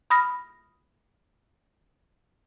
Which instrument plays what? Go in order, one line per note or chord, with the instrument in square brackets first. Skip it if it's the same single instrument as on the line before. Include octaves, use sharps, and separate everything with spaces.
[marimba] B5 D#6 F6 A#6